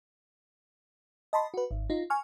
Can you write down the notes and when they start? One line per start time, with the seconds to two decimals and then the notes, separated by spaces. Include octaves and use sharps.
1.33 D#5 A5 B5 C6
1.54 F#4 B4
1.71 G#1
1.90 D#4 F4
2.10 G#5 C#6 F6